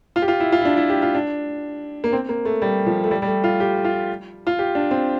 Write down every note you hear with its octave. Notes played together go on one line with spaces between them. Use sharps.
F4
G4
F4
E4
F4
E4
D4
E4
G4
F4
D4
A#3
C4
A#3
A3
G3
F3
A3
G3
G3
A3
F4
G4
F4
F4
G4
D4
C4